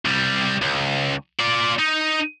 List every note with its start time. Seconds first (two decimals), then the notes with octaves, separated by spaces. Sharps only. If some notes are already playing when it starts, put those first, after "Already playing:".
0.05 C2 G3
0.62 C#2
1.40 F4 D5
1.79 D#4